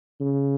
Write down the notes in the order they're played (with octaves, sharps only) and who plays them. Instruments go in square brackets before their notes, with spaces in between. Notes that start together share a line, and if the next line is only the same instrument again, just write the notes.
[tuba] C#3